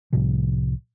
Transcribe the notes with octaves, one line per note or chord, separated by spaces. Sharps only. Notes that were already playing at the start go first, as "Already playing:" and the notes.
C2 A2 C3 F3